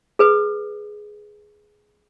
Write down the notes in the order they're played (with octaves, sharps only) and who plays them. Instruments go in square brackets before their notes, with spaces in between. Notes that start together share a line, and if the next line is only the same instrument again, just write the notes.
[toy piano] G#4 B4 D#6